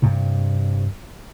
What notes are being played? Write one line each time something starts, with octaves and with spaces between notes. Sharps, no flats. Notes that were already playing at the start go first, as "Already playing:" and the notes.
G2 C3